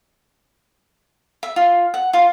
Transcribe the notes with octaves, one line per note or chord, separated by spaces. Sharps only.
E5
F4
F#5
F4